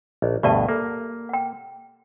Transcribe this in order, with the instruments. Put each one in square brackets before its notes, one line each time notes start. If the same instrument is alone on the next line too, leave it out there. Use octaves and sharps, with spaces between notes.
[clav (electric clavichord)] A#1 [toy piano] D#5
[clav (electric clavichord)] D2 G2 B2 [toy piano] G4 D5 A5
[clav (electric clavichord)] A#3 [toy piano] A4
[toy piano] F#5 G5